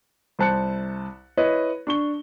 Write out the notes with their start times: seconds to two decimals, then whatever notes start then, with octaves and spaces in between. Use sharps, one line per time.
0.39 C2 C5 A5 F#6 C#7
1.37 E4 B4 C#5 D#5
1.87 D4 C#6 G7